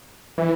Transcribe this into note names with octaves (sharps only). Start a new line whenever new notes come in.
E3